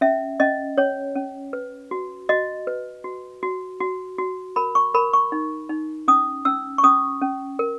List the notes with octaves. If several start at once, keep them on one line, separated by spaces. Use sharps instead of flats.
C#4 E5
C#4 D#5
C#4 C#5
C#4
B4
F#4
F#4 D#5
B4
F#4
F#4
F#4
F#4
A#4 B5
C#6
A#4 B5
C#6
D#4
D#4
C#4 D#6
C#4 E6
C#6
C#4 D#6
C#4
A#4